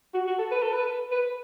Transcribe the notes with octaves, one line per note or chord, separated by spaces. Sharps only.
F#4
F#4
A4
B4
A4
B4
B4